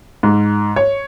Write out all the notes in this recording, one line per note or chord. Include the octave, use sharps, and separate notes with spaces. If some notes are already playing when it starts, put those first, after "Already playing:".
G#2
C#5